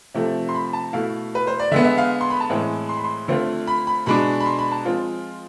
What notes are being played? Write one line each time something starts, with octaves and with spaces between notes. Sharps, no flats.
C3 F3 A3
C6
B5
A5
B2 A3 E4 F5
B4
C5
D5
D3 G#3 B3 E5
E5
F5
C6
B5
A5
A2 E3 G#3 C4
C6
B5
C6
D3 A3 C4 F4
B5
B5
B2 G#3 D4 B5
B5
C6
B5
A5
F3 G#3 C4 F4